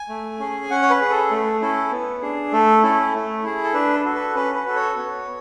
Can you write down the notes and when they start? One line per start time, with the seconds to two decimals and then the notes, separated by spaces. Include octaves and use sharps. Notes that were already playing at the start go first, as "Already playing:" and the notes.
Already playing: G#5
0.09 A3
0.39 C#4 G#4
0.70 C#4 F#5
0.82 C#5
0.90 B4
1.01 G#4
1.10 A4
1.31 A3
1.61 C#4 E4 A4
1.92 B3
2.22 D4 G#4
2.53 A3 A4
2.83 C#4 E4 A4
3.14 A3
3.43 E4 G#4
3.63 A4
3.74 D4 B4
3.94 A4
4.05 F#4 A4
4.15 B4
4.35 C#4 B4
4.55 B4
4.66 F#4 A4
4.76 C#5
4.96 B3